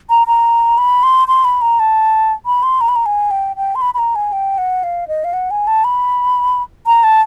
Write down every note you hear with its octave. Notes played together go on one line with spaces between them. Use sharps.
A#5
A#5
B5
C6
C6
B5
A#5
A5
B5
C6
A#5
B5
A#5
G#5
G5
G5
C6
B5
B5
A#5
G#5
G5
F#5
F5
D#5
F5
F#5
G#5
A5
B5
A#5
A5